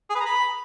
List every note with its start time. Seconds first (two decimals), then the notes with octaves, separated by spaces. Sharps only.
0.10 G#4
0.15 B4
0.20 A#5
0.26 B5